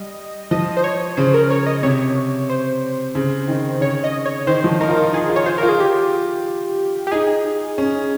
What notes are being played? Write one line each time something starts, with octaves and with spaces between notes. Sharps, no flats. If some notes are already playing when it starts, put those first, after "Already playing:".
Already playing: G3 D#5
F3 D#5
C5
C#5
C#3 C5
A#4
C#5
D#5
C3 C#5
C5
C#3
D#3
C#3 C#5
D#5
C#5
D#3 C5
F3
D#4 A#4
F4
D#4
D#4 G#4
F4
C#5
F4 C5
F4 A#4
G#4
G4
G4
D#4 G#4
C#4